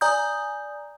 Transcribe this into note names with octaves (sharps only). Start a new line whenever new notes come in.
D5 G#5 A#5 D#6 G6